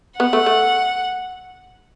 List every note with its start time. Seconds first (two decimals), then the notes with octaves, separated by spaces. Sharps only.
0.20 B3 F#5
0.33 A3
0.46 A3